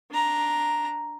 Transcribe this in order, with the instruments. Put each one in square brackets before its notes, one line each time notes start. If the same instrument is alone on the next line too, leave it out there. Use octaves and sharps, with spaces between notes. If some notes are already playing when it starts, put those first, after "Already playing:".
[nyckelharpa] D4 A#5